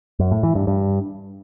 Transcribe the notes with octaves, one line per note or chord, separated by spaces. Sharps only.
F#2
A2
E3
G2
G2